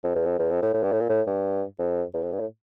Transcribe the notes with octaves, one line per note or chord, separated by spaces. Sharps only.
F2
E2
F2
E2
F2
A2
A2
G2
A2
A#2
A2
G2
F2
E2
F2
G2
A2